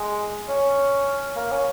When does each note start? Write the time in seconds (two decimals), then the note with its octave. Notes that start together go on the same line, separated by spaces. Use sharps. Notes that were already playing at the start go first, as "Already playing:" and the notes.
Already playing: G#3
0.48 C#4
1.36 A#3
1.51 C#4